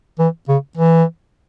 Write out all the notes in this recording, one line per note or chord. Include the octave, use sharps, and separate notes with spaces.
E3
C#3
E3